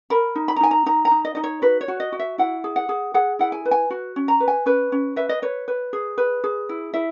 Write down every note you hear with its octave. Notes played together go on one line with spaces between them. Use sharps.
A#4 B5
D#4
B5
A#5
D#4 G#5
A#5
D#4 A#5
A#5
D#4
D#5
D#4 D#5
C#5
F#4 B4
C#5
F#4
D#5
F#4
E5
E4 F#5
G#4
F#5
G#4
G#4 F#5
E4 F#5
G#5
B4
G#5
F#4
C#4
A#5
B4
G#5
C#4 B4
C#4
B4 E5
D#5
B4 C#5
B4
G#4
B4
G#4
E4
E4 E5